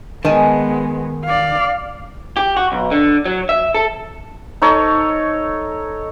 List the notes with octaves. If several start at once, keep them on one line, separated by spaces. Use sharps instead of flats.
D#3 G#3 B3 G#5 A5 D#6
D5 F5
G4
F#4
B1
D3
F#3
E5
A4
D#4 A4 C#5